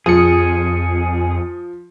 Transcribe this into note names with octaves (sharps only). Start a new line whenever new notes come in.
F2 F3 G#4 D#6 C#7